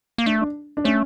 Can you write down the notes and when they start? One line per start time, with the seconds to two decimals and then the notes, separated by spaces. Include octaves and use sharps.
0.18 A#3
0.26 A3 D4
0.41 D4
0.77 D4
0.84 A3 C#4